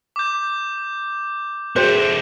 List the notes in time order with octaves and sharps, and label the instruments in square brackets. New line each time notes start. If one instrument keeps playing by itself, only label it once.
[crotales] D6 G6
[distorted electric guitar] A3 C4 [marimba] F#4 G#4 [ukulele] C5